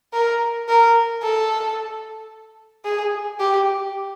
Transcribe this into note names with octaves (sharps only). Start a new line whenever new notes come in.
A#4
A#4
A4
G#4
G4